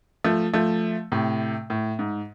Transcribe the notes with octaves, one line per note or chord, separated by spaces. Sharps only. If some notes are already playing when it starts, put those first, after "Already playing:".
F3 A3
F3 A3
A2 C3
A2
G#2